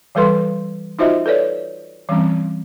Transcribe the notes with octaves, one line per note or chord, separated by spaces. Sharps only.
E3 G3 A4 B4 C6
D#4 F4 F#4 C5 D#5 E5
A4 B4 C#5 D5
E3 G3 C4 C#4